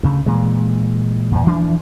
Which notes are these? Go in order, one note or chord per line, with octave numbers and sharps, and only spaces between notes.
D2 C#3
A#2 E3 G#3
E2 A#2
E3 F3 D4